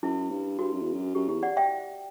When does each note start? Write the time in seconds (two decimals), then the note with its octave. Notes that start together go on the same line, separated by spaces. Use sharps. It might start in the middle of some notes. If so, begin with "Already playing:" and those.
0.03 F#2 E4
0.30 G2
0.59 G2 F#4
0.73 F#2
0.82 E2
0.93 F#2
1.15 F#2 G4
1.29 E2 G4
1.43 D5 F#5
1.57 E5 G5